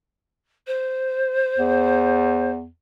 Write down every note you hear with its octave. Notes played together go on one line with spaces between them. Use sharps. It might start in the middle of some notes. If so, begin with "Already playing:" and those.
C5
E2